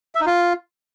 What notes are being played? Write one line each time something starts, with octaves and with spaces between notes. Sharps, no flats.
E5
D#4
F4